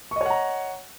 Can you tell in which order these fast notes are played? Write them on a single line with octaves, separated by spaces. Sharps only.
C#6 D#5 C#5 F#5 A#5